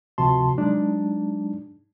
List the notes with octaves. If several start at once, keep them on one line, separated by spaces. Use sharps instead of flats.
D2 C3 F3 F#4 A5 C6
F#3 G#3 D4 D#4